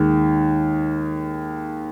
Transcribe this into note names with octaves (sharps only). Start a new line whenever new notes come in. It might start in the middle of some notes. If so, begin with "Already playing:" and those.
Already playing: D#2 D#3 G#3